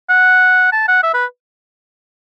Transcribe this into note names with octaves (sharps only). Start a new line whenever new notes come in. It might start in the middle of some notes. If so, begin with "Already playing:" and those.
F#5
A5
F#5
E5
B4